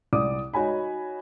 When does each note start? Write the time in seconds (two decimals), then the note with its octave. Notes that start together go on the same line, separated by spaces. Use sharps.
0.13 C2 D5 D6 D#6
0.54 D#4 F#4 C#5 G#5 B5